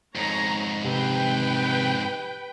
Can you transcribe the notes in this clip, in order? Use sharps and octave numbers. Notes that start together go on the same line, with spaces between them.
F2 G#2 C#5 A#5
C3 B4 G5